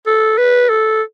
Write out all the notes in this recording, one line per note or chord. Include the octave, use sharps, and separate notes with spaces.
A4
B4
A4